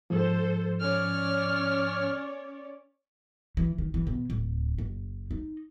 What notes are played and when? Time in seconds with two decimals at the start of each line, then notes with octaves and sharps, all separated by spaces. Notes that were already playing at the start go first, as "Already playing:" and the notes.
0.10 G#2 F3 A4 C5
0.81 C#4 C#5 D5 F6
3.57 E3
3.78 D#3
3.94 E3
4.07 B2
4.30 D1
4.78 F#1
5.31 D#4